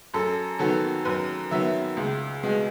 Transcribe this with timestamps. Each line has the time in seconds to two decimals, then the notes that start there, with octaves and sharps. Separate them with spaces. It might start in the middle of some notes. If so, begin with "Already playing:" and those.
0.14 F#2 A4
0.59 D#3 F#3 B3 A4
1.05 F#2 B4
1.51 D#3 F#3 B3 E5
1.97 C#2
2.43 B2 G#3 B3